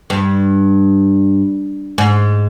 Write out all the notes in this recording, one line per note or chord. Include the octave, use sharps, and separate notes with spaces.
G2
G#2